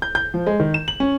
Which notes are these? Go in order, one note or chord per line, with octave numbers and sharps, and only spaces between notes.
G6
G6
F3
G#3
D#3
E7
F#7
C#4